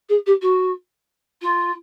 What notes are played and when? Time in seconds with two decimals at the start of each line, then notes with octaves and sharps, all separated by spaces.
0.08 G#4
0.26 G4
0.41 F#4
1.41 F4